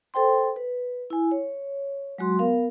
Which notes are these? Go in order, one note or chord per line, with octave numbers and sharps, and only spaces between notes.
A4 C5 G5 C6
B4
E4 G#5
C#5
F#3 G#3 F#4 C6
B3 A#4 F5